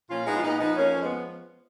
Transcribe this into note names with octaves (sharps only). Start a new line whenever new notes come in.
A#2 C#4 F4
G#3 B3 D#4
F4
A#2 B3 D#4
F3 B3 D#4
F2 A#3 C#4
F3
G#3 B3